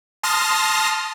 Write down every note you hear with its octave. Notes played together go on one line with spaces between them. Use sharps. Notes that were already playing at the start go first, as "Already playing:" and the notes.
A5 C6 D#6 F6 A#6